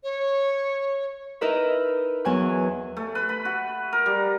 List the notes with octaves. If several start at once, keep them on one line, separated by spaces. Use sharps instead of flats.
C#5
D#4 E4 A#4 B4 D#5 E5
E2 F#3 G#5 F#6
A3
B4
B5
F#4
A#4
G3